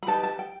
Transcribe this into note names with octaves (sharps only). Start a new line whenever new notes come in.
B5
D#4 G4 B4 A5
A5
G5